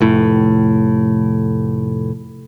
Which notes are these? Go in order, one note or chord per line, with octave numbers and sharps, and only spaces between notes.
F1 A2